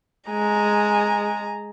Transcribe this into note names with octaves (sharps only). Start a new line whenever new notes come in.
G#3 G#5 A#5